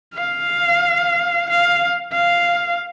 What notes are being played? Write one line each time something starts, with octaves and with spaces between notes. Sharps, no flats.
F5
F5
F5